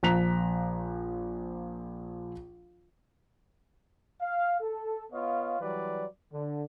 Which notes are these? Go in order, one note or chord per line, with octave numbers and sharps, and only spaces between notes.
A#1 F3 A#5 F#6 B6 F7
F5
A4
B3 F4 C#5 D#5 F5
E3 F#3 G3 B4 D5
D3